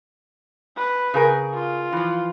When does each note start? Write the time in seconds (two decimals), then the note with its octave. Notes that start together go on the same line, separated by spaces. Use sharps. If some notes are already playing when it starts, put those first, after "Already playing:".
0.77 B4
1.14 C#3 G#4 A#4
1.54 F4
1.92 E3 F3